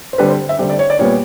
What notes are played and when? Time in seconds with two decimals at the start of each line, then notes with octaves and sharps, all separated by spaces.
0.13 C5
0.18 D3 G3 C4 B4
0.29 C5
0.49 E5
0.58 D3 G3 C4
0.69 D5
0.79 C#5
0.90 D5
0.99 A#2 G3 B3 C#5